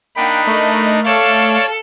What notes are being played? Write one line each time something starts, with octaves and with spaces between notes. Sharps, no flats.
A#3 D4 D#4 F#5 G5 B5
A3 A#4 D#5
A4 C#5 D5 F5 A5